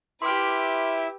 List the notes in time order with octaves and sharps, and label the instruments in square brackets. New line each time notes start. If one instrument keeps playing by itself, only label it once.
[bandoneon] E4 E5 [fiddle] G4 B4 [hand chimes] C6 D6 F6